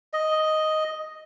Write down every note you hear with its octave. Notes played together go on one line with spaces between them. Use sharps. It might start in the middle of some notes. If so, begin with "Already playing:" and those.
D#5